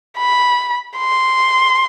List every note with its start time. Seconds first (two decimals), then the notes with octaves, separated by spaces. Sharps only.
0.18 B5
0.98 C6